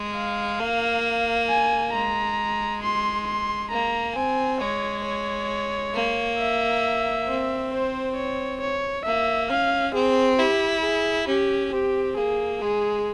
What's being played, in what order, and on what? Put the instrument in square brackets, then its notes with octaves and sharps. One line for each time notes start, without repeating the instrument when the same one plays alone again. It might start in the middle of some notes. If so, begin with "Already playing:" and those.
Already playing: [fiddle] G#3
[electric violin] F5
[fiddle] A#3
[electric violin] G#5
[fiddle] G#3 [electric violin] A#5
[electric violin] C6
C6
[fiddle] A#3 [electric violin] A#5
[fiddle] C4 [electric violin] G#5
[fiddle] G#3 [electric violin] C#5
[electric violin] C#5
[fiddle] A#3
[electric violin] E5
[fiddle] C4
[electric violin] C5
C#5
C#5
[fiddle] A#3 [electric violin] E5
[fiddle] C#4 [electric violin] F5
[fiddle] C4 [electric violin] G#4
[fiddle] E4 [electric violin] G4
[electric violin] G#4
[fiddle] C#4 [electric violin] G4
[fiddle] C4 [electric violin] G4
[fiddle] A#3 [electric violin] G#4
[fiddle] G#3 [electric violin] G#4